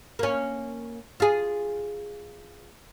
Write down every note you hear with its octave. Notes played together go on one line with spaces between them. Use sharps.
A#3 C#4
F4 G#4